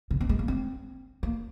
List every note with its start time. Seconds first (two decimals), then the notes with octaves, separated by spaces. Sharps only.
0.11 C#3
0.21 C4
0.29 G#3
0.39 A#3
0.48 C4
1.23 A#3